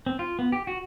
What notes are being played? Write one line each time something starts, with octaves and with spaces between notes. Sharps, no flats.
C4
F4
B3
G4
F#4